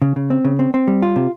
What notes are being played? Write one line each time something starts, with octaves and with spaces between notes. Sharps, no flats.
C#3
C#3
C4
C#3
C4
C4
G3
F4
C3